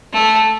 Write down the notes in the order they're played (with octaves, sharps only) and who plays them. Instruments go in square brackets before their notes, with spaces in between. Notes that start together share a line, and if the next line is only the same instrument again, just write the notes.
[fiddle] A3